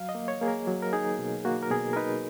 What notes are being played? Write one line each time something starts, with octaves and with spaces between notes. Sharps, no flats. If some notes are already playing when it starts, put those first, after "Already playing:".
Already playing: F#3 F5
D#5
A#3
C#5
A#3 G#4
A#4
F#3
A#4
D#4 G#4
B2
A#3 F#4
A#4
B2 G#4
A#4
D#4 B4